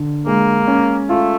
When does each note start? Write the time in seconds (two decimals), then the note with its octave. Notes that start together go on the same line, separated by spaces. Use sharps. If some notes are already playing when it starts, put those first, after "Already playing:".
Already playing: D3
0.26 G#3 A#3
0.67 C#4
1.08 A3 F4